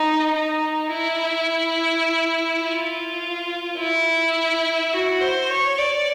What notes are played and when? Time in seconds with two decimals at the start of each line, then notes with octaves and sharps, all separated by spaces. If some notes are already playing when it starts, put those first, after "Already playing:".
Already playing: D#4
0.35 D#4
0.93 E4
2.64 F4
3.78 E4
4.93 F#4
5.21 C5
5.49 C#5
5.78 D5